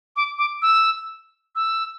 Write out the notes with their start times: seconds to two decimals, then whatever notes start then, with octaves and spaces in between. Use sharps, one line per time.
0.16 D6
0.38 D6
0.62 E6
1.55 E6